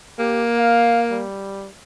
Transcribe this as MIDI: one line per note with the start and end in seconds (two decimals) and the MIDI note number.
0.19 1.23 58
0.19 0.46 67
0.59 1.03 77
1.11 1.70 55